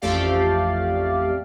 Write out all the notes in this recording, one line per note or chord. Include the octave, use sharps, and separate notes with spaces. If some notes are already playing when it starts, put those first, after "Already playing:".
A1 F2 A3 G4 D5 F5